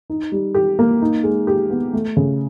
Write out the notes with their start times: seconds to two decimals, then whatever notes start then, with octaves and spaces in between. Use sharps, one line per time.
0.10 D#4
0.32 G3
0.55 G4
0.79 A#3
1.02 D#4
1.24 G#3
1.47 G4
1.70 B3
1.93 A3
2.17 C#3